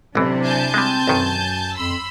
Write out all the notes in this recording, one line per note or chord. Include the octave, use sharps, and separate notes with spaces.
A1 C3 E3 F#3 D4 E4
G#5 A5 G6
G3 G#3 C4
B1 F#2 D#3
F2 B5 C6 E6